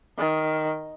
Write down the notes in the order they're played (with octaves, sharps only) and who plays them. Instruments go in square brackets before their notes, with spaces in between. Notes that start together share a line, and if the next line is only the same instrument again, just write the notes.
[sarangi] D#3